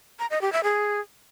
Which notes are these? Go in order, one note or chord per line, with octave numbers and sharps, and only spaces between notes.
A#5
D#5
G4
E5
G#4